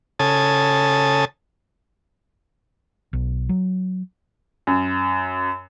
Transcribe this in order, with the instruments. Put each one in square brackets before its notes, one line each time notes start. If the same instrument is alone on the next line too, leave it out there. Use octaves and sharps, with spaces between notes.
[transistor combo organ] C#3 A4 G#5 A5 D#6
[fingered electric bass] B1
F#3
[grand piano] F#2